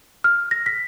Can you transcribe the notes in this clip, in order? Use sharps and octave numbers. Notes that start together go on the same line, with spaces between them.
F6
A#6
B6